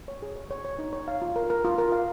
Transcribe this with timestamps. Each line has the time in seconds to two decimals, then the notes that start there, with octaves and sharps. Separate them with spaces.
0.08 C#5
0.22 G#4
0.36 C#5
0.51 C#5
0.65 C#5
0.79 D#4
0.93 C#5
1.08 F5
1.22 F4
1.36 A#4
1.50 A#4
1.64 F4
1.78 A#4
1.92 F5